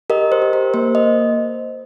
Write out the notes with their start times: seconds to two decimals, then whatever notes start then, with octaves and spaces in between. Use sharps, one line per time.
0.10 G4 A#4 D#5
0.32 C5
0.42 G4
0.53 A#4
0.74 A#3 C5
0.95 D#5